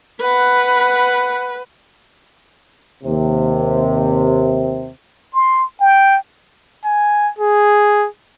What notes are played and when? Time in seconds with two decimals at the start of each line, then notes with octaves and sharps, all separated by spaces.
0.21 B4 F#5 B5
3.04 D#2 C3
5.33 C6
5.80 G5
6.85 G#5
7.38 G#4